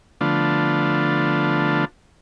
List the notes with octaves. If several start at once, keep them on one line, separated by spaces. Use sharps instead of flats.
D3 F3 A3 B3 D4 F4